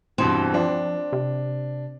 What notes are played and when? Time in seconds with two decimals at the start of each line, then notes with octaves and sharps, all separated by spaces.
0.18 G2 B2 E3 C4
0.54 F3 D4
1.13 C3